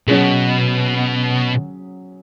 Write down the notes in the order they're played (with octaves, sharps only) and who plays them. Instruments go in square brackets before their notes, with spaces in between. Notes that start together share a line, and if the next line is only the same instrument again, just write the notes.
[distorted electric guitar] B2 [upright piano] F#3 C#4 G#4